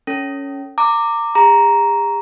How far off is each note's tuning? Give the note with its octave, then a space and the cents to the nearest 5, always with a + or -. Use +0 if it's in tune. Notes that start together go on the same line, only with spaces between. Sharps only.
C#4 +5 A4 +35
A#5 -30 D6 +5
G#4 -40 A#5 +5